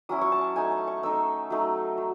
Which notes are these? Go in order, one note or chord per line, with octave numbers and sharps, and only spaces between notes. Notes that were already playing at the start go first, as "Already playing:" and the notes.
F#3 C#4 E4 D#6
C#6
A5
A3 D#4 G#5
A5
C#6
A3 D#4 E6
F#3 A3 D#4
F#3